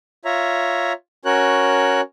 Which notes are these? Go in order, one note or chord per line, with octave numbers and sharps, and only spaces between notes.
F4 C#5 E5 A#5
C#4 F#4 A#4 C#5 F#6